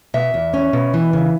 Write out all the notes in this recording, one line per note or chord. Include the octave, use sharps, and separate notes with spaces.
B2 E5
E2
C#4
B2
E3
C#3